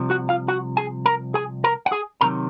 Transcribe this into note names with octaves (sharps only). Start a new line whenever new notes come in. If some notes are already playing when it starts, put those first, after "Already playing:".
Already playing: C2 C3 F3
F#4 F#5
F4 F5
F#4 F#5
G#4 G#5
A#4 A#5
G#4 G#5
A#4 A#5
F#5
G#4 G#5
C3 D#3 F#3 A#4 A#5